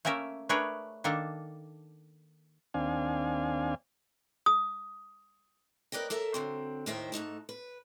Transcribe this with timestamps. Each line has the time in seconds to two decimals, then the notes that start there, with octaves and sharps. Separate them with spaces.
0.05 A3 A#3 C#4 A#4 E5
0.49 A3 D4 G#4 A#4 B4 C#5
1.04 D#3 A#3 D4 A4
2.74 D#2 C4 D4 F5 G#5
4.46 D#6
5.92 A#4 B4 D5 D#5 G5
6.10 A4 A#4 E5 A5
6.34 D3 F#3 C4
6.86 D#2 A2 D#3 C5 E5 G5
7.12 G#2 A3 D#4 A5
7.49 B4